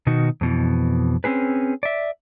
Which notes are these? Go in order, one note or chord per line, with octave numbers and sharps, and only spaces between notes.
B2 D#3 D#4 F#4
F2 B2 E3
C4 C#4 G#4 B4
D5 E5